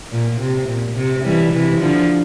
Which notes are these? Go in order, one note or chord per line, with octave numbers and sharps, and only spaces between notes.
A#2
C3
A#2
C3
E3 G3
C3 E3
D3 F3